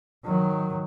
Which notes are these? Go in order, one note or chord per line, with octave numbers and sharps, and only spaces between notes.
D#3 F#3